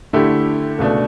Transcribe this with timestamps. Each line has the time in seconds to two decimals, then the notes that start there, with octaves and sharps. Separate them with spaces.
0.13 D3 A3 E4 G4
0.79 C#2 B2 A3 D4